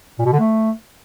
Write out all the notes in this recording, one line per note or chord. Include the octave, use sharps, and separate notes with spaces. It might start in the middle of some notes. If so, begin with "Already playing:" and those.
A#2
B2
D3
A3